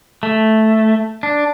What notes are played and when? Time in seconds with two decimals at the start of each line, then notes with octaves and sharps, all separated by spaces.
0.23 A3
1.23 D4